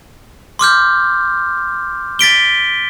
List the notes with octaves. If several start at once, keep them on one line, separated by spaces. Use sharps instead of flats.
C6 D6 F6 G6
A6 B6 D7 G7